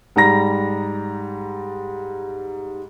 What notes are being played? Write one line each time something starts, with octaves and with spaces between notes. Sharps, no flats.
G#2 G3 A#5 A#6